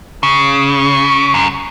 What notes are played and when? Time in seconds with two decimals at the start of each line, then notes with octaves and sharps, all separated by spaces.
0.23 C#3
1.34 F#2